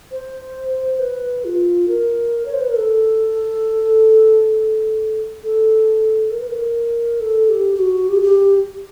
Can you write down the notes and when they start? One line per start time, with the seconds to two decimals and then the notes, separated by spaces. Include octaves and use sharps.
0.11 C5
0.99 B4
1.45 F4
1.88 A#4
2.46 C#5
2.53 C5
2.61 B4
2.69 A#4
2.76 A4
5.43 A4
6.31 A#4
6.39 B4
6.47 A#4
7.20 A4
7.49 G4
7.75 G4
7.79 F#4
8.08 G4
8.16 G#4
8.22 G4